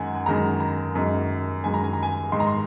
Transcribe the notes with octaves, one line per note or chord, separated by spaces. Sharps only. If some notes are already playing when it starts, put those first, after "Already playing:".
Already playing: F#2 D#3 G#3 F#5 G#5
G#5
F#2 D#3 G#3 A#5
A#5
F#2 D#3 G#3
F#2 D#3 G#3 G#5
A#5
G#5
A#5
G#5
G#2 D#3 G#3 C6
A#5
C6